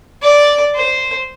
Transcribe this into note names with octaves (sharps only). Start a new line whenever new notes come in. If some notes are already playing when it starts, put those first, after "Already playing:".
D5
C5